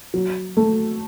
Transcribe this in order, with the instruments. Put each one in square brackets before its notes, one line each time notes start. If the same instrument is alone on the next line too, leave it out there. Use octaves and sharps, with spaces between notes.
[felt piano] F#3
A3